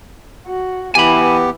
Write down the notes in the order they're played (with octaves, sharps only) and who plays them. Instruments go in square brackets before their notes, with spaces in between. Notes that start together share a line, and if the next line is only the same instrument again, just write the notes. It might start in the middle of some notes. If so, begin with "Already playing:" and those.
[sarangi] F#4
[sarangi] E3 [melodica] B3 G4 [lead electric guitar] G#5 B5